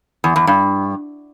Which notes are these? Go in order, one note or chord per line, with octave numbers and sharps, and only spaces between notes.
E2
E2
G2